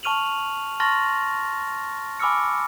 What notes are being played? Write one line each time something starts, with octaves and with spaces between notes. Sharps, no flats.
A5 C#6 F6 D#7 F7 F#7
A5 C6 C#6 F6 A6 A#6
G#5 B5 D6 E6 F6 C#7